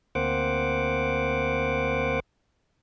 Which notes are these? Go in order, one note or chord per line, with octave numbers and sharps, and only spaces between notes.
D2 A#3 C4 C5 F#5 D6